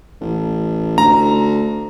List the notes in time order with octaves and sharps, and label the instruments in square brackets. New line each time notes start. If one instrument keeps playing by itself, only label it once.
[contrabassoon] A1
[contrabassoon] D2 [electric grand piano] A#5